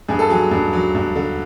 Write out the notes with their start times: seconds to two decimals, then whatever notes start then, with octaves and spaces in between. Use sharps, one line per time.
0.08 G2 G#4
0.19 A4
0.30 F#3 G#4
0.51 G2
0.73 F#3
0.95 G2
1.15 D3